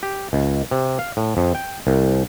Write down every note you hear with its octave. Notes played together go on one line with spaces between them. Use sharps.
G4
C#2
C3
F5
A2
F2
G5
C2